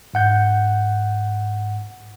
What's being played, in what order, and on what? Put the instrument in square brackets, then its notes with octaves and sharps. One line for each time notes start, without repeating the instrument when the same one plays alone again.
[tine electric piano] G#2 F#5 G6